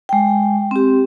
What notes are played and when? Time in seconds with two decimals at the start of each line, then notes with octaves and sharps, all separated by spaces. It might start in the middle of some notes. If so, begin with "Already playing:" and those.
0.09 G#3 G5
0.71 C4 G4